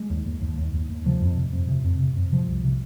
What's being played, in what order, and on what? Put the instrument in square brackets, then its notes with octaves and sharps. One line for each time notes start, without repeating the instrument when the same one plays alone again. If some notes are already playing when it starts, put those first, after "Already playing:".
Already playing: [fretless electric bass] G#3
D#2
D#2
D#2
D#2
D#2
D#2
C3 F3
F2
C3
F2
C3
F2
C3
F2
C3 F3
C2
C3